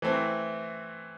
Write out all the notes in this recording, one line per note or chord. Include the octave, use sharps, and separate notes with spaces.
E3 A3 C4